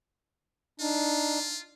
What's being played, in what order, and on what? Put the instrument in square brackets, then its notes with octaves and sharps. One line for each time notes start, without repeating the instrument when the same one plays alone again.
[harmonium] D4 D#4 [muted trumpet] F4